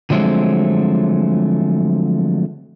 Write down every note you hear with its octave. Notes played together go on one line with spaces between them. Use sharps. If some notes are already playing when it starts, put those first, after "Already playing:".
D3 F3 F#3 G#3 A3 C4